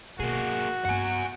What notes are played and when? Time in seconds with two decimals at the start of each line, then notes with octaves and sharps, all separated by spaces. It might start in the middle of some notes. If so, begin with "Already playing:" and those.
0.20 B2 A#3 F#4 G#4
0.85 G2 B3 F#5 G#5